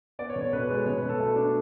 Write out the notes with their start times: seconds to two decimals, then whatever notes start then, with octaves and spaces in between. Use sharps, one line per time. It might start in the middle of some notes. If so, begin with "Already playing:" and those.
0.19 B3 D5
0.30 C#5
0.36 B2
0.41 C#5
0.53 B2 B4
0.63 B4
0.70 G#3
0.75 C#5
0.86 B2 C#5
0.98 B4
1.02 B2
1.09 A4
1.20 A3
1.36 D4